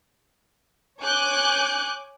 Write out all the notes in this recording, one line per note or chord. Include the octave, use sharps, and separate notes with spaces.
C#5 G#5 D6 F#6 G6